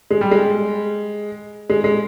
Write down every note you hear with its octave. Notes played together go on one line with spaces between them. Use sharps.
G#3
G3
G#3
G#3
G#3